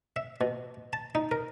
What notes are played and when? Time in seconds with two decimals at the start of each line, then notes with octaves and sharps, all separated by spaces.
0.16 E5
0.41 B2
0.93 A5
1.15 D#4
1.31 A#4